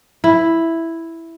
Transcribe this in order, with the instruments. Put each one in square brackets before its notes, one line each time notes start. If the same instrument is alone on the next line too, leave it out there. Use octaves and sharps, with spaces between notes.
[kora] E4